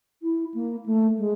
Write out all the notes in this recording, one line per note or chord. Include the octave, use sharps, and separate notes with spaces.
E4
A#3
A3
G#3